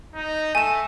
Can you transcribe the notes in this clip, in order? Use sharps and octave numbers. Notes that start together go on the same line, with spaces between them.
D#4
A3 G#5 E7